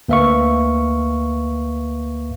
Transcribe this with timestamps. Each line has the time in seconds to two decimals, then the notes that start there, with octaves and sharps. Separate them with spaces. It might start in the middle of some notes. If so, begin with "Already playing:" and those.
0.08 D2 A#3 B4 E5 F5 C#6